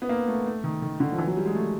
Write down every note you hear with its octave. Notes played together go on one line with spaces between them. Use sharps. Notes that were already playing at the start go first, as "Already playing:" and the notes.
B3
A#3
A3
A3
D#3
D#3
D3
F3
E3
F#3
G3
G#3
A3